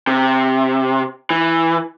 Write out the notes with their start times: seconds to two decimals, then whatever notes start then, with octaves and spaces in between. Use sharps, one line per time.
0.07 C3
1.30 E3